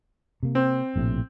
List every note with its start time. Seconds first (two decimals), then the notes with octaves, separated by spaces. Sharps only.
0.43 C3 A#3
0.55 C4
0.96 A#1 A2 C3